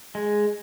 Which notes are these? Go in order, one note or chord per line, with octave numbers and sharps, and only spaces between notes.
G#3